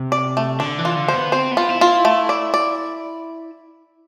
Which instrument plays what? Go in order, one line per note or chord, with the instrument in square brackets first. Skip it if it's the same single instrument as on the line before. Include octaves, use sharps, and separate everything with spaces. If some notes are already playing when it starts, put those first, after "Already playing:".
Already playing: [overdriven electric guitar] C3
[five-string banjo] D5
A3
[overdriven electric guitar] D3 [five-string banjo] D4
[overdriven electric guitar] E3
[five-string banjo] F4
[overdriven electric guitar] D3
[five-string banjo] C5
[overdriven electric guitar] B3
[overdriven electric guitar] C4 [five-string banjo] C5
[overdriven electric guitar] B3
[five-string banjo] F4
[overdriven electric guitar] E4
[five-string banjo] F4
[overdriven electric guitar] E4
[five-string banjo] A3
D5
D5